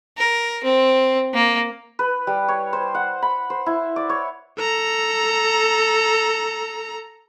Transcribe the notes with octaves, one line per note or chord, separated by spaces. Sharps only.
A#4
C4
A#3
B4
G3
C#5
C5
F#5
B5
C5
E4
D5
C#5
A4 A#5